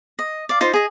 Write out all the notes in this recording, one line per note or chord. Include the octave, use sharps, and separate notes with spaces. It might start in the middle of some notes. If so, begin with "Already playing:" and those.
D#5
D5 F5
D#4 F4 C5
G#4 D#5